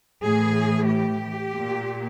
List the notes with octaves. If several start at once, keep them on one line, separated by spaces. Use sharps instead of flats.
A2 E3 G#4
G4
A#2